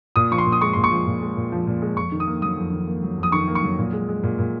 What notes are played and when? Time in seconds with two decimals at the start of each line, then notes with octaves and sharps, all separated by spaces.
0.16 A#2 D#6
0.31 F3 C#6
0.38 C6
0.46 A#2
0.52 D#6
0.61 G#3 C#6
0.73 A#2 C6
0.84 C#6
0.91 F3
1.07 A#2
1.21 G#3
1.37 A#2
1.52 F3
1.67 A#2
1.82 G#3
1.97 F2 C#6
2.12 D#3
2.20 D#6
2.27 A#3
2.42 F#3 D#6
2.57 F2
2.72 D#3
2.87 A#3
3.03 F#3
3.18 F2
3.23 D#6
3.32 D#3 C#6
3.48 A#3
3.55 C#6
3.63 F#3
3.78 A#2
3.93 G#3
4.09 G#3
4.23 A#2
4.39 A#2